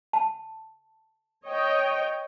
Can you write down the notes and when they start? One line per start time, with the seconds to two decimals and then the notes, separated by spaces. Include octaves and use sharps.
0.13 A5
1.46 C#5 D#5 G5